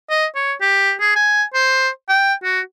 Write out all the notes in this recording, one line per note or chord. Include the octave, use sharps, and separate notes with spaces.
D#5
C#5
G4
G#4
G#5
C5
G5
F#4